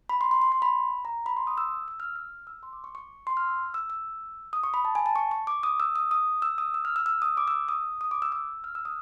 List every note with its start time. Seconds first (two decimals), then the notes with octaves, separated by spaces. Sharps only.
0.09 B5
0.21 C6
0.31 C6
0.42 C6
0.52 C6
0.62 B5
1.05 A#5
1.26 B5
1.37 C6
1.47 D#6
1.58 E6
1.88 E6
2.00 F6
2.16 F6
2.47 E6
2.63 C6
2.73 D6
2.84 C#6
2.95 C#6
3.27 C6
3.37 F6
3.47 E6
3.74 E6
3.90 E6
4.53 D#6
4.64 C#6
4.74 B5
4.85 A5
4.95 G#5
5.06 A5
5.16 C#6
5.31 C#6
5.47 D6
5.63 D#6
5.80 E6
5.96 D#6
6.11 D#6
6.42 E6
6.58 D#6
6.74 E6
6.85 F6
6.96 E6
7.06 E6
7.22 D#6
7.37 D6
7.48 E6
7.69 D#6
8.01 D#6
8.11 D6
8.22 E6
8.32 E6
8.64 F6
8.75 E6
8.85 D#6